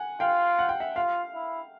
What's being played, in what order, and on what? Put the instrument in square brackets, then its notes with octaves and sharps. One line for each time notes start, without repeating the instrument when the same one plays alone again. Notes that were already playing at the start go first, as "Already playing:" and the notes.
Already playing: [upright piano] F#5 G#5
[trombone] F4 [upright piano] F5 G5
[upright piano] F#5
G5
E5 F#5
[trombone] F4 [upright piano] F5
[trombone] E4